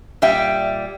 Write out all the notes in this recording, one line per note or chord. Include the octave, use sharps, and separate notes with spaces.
A#2 G3 E5 G5